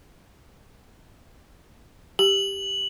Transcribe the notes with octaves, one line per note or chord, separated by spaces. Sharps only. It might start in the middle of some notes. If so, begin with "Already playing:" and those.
G4 F#7